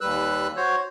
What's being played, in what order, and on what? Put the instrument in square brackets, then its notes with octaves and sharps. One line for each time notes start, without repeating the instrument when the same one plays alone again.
[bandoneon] D#2 G3 B4 E6 F#6
F#4 C5 C#5